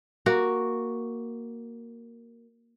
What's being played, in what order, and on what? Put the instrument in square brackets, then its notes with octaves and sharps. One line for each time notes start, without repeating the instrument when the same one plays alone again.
[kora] A#3 F#4